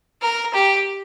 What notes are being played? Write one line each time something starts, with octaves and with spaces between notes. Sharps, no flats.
A#4
G4